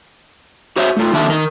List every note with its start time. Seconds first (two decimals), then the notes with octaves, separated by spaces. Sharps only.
0.76 F#4 C5 C#5 E5
0.97 A3 F4
1.13 D3 D#3 A#3 E5 A5
1.28 D#3 A#4